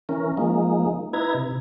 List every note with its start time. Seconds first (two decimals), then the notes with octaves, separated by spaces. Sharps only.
0.09 E3 C#4 A#4
0.37 F3 G#3 A#3 D#4
1.13 D#4 E4 B4 A#5 G#6
1.35 C3